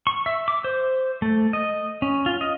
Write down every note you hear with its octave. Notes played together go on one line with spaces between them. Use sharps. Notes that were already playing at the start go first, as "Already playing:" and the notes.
C#6
E5
D6
C5
A3
D#5
C#4
F4
D#5